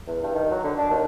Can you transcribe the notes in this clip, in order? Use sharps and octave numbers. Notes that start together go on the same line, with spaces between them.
E2
G2
D#3
F#3
D3
D4
D#2